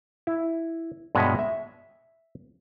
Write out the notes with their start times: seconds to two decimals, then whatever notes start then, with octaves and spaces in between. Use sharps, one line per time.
0.27 E4
1.15 G2 B2 G#3 C#5 D#5 E5
1.39 E5